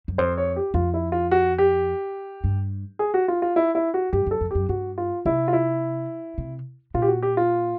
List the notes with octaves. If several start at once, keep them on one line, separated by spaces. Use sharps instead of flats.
F#2
F2 C5
C#5
G4
F2 F4
E4
F4
F#4
G4
G2
G#4
F#4
F4
F4
E4
E4
F#4
G2 G4
F#2 A4
F2
F#2 G4
G2 F#4
F4
C3 E4
F4
E4
C3
A#2 F4
G4
F#4
G4
F4